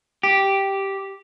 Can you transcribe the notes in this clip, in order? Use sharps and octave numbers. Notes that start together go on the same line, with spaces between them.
G4